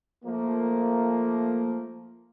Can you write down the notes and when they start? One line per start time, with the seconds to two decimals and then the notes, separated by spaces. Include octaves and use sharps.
0.24 F3 A3 A#3